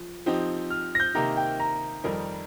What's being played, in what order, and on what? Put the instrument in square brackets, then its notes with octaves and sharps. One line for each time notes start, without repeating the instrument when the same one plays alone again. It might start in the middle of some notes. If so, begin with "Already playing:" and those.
Already playing: [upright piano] F3
F3 C4 D#4 G4
[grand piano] F6
A#6
G6
[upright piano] C3 D#3 A#3 D#4 G4 [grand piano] A#5
[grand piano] G5
A#5
[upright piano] F2 D#3 G3 D#4 A#4